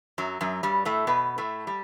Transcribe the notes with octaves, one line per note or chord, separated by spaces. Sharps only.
F#2 F#3
F#2 F#3
G2 G3
A2 A3
B2 B3
A2 A3
G3